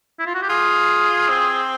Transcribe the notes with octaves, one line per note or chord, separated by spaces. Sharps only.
E4
F4
F#4
G4
F4 G#4
C4